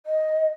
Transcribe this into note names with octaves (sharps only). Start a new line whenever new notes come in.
D#5